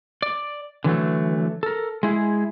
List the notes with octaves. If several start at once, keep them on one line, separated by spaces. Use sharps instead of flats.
D5
D3 E3 F#3 A3
A4 A#4
G#3 E4 G#4